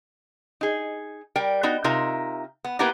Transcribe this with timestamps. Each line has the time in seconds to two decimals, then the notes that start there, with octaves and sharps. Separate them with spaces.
0.61 D#4 G#4
1.36 G3 A#4 G5
1.63 B3 D#4 F#4
1.84 C3 D#4 F4 A#4 E5
2.64 B3
2.79 A#3 B3 E4 G4 A#4 B4